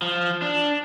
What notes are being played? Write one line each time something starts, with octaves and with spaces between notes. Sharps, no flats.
F3
D4